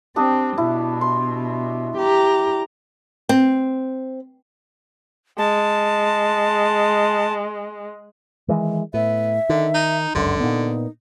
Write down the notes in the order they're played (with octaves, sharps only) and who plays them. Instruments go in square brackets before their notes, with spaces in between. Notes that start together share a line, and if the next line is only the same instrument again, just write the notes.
[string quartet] C4 [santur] D4 G4 D#5
[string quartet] B2 [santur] E4
[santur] C6
[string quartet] G4 A#5
[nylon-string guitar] C4
[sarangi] G#3 [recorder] A5
[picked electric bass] D#3 E3 G#3
[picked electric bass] A2 [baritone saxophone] B3 [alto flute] E5
[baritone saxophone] D3 [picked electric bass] D#3
[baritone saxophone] D#4
[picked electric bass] G1 C#2 F#2 [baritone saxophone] D3 [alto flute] C6
[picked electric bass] A#2 B3 [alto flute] D#4